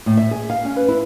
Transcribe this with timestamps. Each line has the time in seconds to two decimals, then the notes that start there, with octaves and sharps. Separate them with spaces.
0.06 A2
0.17 E5
0.31 G#4
0.50 F5
0.65 C#4
0.76 B4
0.88 E4